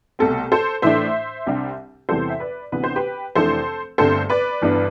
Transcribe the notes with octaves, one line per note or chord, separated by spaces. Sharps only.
C2 B2 A3 C4 A4
A4 C5
A2 E3 A3 D4 C5 E5
C2 C3 G3 D4
E2 C3 E3 G3 A4 C5
E5
B4 D5
D2 C3 E3 B3 D4 B4
C5
G4 B4
F1 F2 E3 A3 D4 A4 C5
G1 G2 D3 A3 C4 A4 C5
B4 D5
G1 G2 E3 B3 D4